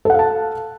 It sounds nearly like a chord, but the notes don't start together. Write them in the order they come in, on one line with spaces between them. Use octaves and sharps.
A4 F#5 F5 A5